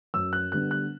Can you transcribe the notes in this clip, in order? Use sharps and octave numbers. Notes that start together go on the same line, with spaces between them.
F#2 E6
F#6
D3 G3 B3 F#6
F#6